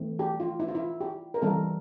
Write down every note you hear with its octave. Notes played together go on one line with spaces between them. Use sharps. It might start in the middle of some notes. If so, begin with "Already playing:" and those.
Already playing: E3 A3 C4
G4
F4
E4
F4
E4
G4
A#4
E3 G3 C4 A4